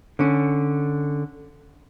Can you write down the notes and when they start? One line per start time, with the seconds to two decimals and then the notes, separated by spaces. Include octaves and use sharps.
0.19 D3 C#4